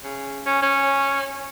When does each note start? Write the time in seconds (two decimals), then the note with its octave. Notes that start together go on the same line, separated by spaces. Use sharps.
0.04 C#3
0.46 C#4
0.62 C#4